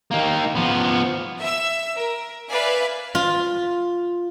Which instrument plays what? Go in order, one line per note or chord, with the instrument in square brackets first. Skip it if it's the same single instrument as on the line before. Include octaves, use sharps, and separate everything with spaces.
[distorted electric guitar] D#3 A#3
F3 B3
[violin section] E5 E6
A#4
B4 D5 E5 F5 G#5
[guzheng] F4